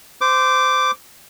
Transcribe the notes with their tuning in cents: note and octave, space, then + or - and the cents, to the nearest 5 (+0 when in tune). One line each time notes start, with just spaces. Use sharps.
C5 -25 D6 +0